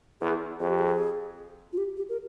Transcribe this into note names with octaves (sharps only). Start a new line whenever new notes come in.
E2 G#4
F2 G#4
G4
G#4
F4
G4
G4
A#4